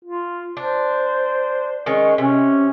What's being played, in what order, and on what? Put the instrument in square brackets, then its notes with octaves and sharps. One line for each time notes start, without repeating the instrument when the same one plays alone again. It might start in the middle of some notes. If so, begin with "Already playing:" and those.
[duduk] F4
[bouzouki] D4 [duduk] C5
[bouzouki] D#3 G#3 C#4
[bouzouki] C3 [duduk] C#4